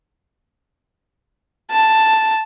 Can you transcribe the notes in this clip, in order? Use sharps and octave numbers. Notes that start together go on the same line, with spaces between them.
A5